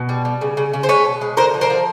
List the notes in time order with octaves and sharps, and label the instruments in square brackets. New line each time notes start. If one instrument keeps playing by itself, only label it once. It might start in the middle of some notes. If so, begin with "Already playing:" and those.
Already playing: [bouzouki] B2
G3
G3
C#3
C#3
C#3
C5
G#3 B4 C#5
B2
G#3
D3 A#4 C5
F3
A#4 C5
F3